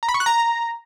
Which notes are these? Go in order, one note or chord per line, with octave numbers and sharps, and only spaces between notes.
A#5
B5
C#6
F#6
A#5